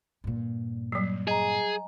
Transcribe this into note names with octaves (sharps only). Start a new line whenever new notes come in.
G2 A#2
F#3 G3
G#4 D#5 G#5 A#5